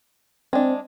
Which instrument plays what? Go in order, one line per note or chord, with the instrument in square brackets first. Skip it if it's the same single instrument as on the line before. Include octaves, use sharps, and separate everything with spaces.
[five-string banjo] G#3 D4 [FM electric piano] C4